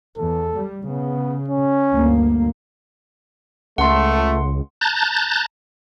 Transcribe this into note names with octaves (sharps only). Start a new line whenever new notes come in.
E2 A4
G3
C#3 B3
C#4
D2 G2 A#3
C#2 A3 F#5 C6
A5 A#5 F#6 G6 A6